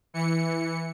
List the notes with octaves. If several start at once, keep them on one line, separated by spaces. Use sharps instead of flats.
E3 C#7